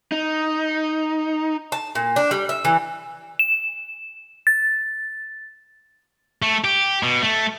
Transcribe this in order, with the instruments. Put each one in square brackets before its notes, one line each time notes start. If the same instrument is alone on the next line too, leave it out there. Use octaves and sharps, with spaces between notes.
[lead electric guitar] D#4
[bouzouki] A5
A#2
D4
G3
E5
E3
[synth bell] E7
A6
[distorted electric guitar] A3
G4
B2
A3